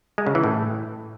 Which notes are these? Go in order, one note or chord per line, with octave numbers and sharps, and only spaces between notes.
G#3
C#3
E3
A2